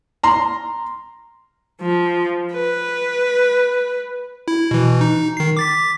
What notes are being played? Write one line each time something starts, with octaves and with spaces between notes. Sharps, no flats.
A#5 C6
F3
B4
E4
B2 E3
D#4
D#3 C7
D6 A6 B6